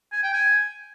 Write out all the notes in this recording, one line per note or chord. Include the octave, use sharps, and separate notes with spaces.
G#5
G5
G#5